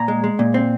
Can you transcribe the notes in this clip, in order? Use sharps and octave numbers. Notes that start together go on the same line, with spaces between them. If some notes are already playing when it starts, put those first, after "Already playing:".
Already playing: A#2 A#5
G#3
G#3
A#2
C4